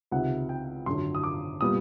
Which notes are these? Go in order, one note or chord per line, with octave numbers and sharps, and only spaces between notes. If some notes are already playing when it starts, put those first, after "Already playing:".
C#2 C3 D#3 F#5
G5
G#1 F#2 D3 C6
D#6
D6
A#2 G3 B3 D#6